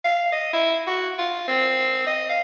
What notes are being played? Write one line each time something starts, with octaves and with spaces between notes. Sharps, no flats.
F5
D#5
E4
F#4
F4
C4
D#5
F5